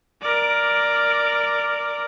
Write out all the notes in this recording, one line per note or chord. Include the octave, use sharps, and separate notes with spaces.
A#4 D5